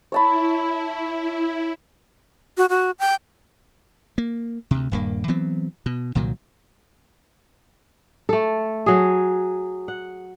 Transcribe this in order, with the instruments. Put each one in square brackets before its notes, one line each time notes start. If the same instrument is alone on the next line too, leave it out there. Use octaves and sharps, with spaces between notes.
[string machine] E4 [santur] C#5 A5 B5
[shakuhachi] F#4
F#4
G5
[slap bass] A#3
D2 C3
D#1 G2 A#3
E3 F#3 B3 C4
B2
C2 A#2 D#3 F#3
[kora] A3 A4
F#3 G#4
F#5